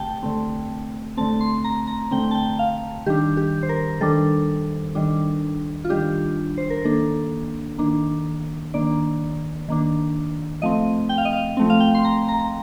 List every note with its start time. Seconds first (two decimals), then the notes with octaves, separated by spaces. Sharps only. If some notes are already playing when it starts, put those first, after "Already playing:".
Already playing: D3 A3 C4 G4 G5 A5
0.22 D3 A3 C4
1.17 D3 A3 C4 A5
1.41 C6
1.64 A#5
1.87 A#5
2.11 D3 A3 C4 G5
2.31 A5
2.35 G5
2.59 F5
3.06 D#3 G3 D4 G4
3.37 G4
3.63 C5
3.69 A#4
4.01 D#3 G3 D4 A4
4.95 D#3 G3 D4
5.85 F4
5.90 D#3 G3 D4 G4
6.58 C5
6.70 A#4
6.84 D#3 A#3 D4 A4
7.78 D#3 A#3 D4
8.74 D#3 A#3 D4 D5
9.68 D#3 A#3 D4
10.62 F3 A3 C4 D#5
11.09 G5
11.18 F5
11.25 D#5
11.33 F5
11.57 F3 A3 C4
11.70 F5
11.80 G5
11.95 C6
12.05 A#5
12.28 A#5
12.39 A#5